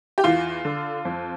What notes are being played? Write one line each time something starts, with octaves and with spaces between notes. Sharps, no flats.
G4
E2 F4
D3
F2